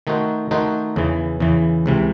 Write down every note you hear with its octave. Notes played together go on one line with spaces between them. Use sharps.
D#3 A3 D#4 F#4 C5
D#3 A3 D#4 F#4 C5
E2 C#3 E3
E2 C#3 E3
C#2 C3 E3